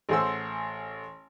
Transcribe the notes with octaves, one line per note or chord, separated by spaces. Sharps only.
A1 G#4 C5 F#5 C6 E6